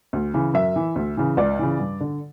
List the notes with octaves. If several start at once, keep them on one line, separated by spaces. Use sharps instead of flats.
D2
C#3 E3
F#2 E5
E3
D2
C#3 E3
C#2 D5
C#3 E3
G2
D3